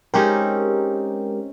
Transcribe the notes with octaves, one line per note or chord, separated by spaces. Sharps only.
G#3 C4 C#4 D#4 G4 A#4